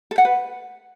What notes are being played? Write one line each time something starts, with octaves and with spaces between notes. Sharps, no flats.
A4
F#5
B4